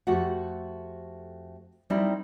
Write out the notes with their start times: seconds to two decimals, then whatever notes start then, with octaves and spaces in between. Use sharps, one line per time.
0.07 F2 A3 F#4 G4 F#5
1.90 G3 C4 D#4 E4 A4 A#4